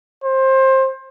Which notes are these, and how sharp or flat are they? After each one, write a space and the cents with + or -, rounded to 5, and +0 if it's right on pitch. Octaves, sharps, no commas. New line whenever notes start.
C5 +20